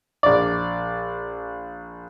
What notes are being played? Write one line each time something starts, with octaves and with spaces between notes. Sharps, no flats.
A#1 D5